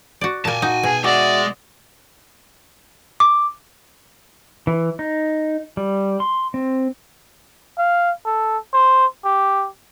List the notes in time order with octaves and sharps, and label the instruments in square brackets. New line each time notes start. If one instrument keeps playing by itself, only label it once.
[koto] F#4 D5
[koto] A#2 A#3 [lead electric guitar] G#5 A5
[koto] D#4 [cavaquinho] F#4
[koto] B2 [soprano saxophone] G#4
[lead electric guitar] G#3 G#4 [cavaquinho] F#4 E5 D6 [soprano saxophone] D5
[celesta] D6
[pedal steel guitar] E3
D#4
G3
C6
C4
[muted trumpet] F5
A4
C5
G4